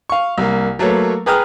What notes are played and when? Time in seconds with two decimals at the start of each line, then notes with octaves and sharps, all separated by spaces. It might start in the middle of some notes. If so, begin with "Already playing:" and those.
0.09 F5 C#6
0.38 C2 A#3
0.79 F#3 A3 A#3 B4 C#5
1.26 G#4 B4 G5 A#5 D#6 F6